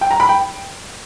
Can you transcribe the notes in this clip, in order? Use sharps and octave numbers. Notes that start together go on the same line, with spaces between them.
G5
A#5
B5
G5